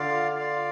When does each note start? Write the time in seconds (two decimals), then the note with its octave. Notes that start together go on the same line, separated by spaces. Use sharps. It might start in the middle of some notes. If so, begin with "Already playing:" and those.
Already playing: D3 F4 D5 F5
0.39 F4 D5 F5